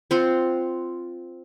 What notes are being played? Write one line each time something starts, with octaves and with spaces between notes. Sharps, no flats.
C4 F4 F#5